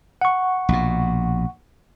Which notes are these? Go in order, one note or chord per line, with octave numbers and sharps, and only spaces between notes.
F#5 C#6
A#1 B2